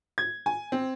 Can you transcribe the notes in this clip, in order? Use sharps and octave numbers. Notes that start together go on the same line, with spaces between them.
G#6
G#5
C4